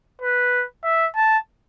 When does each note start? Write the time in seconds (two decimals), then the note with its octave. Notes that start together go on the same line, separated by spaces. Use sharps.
0.21 B4
0.84 E5
1.16 A5